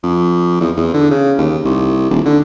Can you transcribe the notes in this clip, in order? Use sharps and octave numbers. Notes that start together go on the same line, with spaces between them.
F2
E2
E2
D3
C#3
D#2
C2
D#1
D3